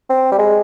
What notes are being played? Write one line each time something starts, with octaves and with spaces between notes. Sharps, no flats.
C4
G3
G#3